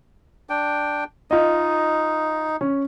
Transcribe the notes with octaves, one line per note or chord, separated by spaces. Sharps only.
D4 G5
D#4 F4 D#5
C#4